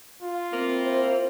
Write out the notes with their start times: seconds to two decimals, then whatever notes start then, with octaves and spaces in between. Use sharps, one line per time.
0.23 F4
0.53 A#3 C4 E4
0.84 C5